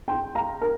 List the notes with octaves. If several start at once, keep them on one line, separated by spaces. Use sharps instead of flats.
G5 C6
F5 A#5
A#4